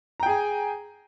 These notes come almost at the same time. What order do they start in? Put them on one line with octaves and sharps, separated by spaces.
A#5 G5 G#4 G#5